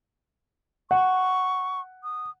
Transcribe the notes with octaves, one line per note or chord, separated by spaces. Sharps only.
F#5 C#6
D#6